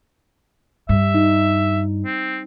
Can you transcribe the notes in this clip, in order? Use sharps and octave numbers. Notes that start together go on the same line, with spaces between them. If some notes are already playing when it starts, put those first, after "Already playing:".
G2 G3 E5
D#4
C4